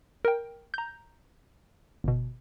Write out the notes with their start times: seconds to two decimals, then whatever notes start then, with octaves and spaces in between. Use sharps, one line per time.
0.25 A#4 G5
0.74 A#5 G6
2.04 G1 B2